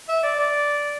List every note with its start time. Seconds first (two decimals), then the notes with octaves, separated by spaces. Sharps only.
0.09 E5
0.24 D5
0.39 D5